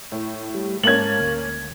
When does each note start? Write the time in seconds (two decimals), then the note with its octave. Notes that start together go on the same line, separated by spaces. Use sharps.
0.12 A2
0.54 G3
0.84 G#2 A#3 C#4 A5 G#6 F#7
1.20 D2